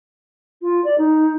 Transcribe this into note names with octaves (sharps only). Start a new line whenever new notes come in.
F4
D5
D#4